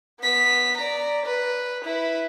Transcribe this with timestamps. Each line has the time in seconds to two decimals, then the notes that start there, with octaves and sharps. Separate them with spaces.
0.21 B3 B6
0.77 D5 A#5
1.26 B4
1.84 E4 B4